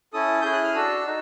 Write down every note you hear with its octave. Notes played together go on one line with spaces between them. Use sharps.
C#4 E4 A4 D#6
C#4 E4 G#4 G6
F#6
F6
D4 F#4 A4 E6
D#4 F#4